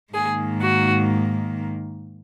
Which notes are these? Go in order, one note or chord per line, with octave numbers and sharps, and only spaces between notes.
G#2 D#3 A#3 G#4
F#4